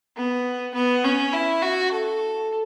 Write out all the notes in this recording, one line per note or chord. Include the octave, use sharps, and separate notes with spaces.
B3
B3
C#4
E4
F#4
A4